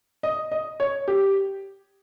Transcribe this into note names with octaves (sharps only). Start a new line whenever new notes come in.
D#5
D#5
C#5
G4